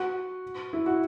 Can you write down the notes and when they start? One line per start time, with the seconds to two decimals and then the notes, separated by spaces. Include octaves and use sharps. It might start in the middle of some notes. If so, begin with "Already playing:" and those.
Already playing: F#4
0.73 E4
0.86 F#4